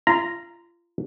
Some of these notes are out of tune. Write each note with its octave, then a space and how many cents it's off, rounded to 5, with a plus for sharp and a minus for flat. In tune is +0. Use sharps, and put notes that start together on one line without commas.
F4 -30 A#5 +0